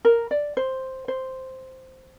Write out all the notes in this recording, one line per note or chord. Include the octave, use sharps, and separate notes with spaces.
A#4
D5
C5
C5